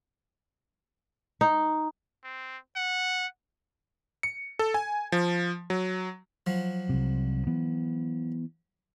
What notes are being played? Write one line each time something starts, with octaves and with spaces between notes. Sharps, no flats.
D#4
C4
F#5
C#7
A4
G#5
F3
F#3
F3 F#3
C2 C3
E3 B3